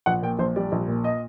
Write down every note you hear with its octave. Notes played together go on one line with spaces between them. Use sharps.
A#1 F#5
A#2 G5
A#1 C5
G3 D5
A#1
A#2
D#5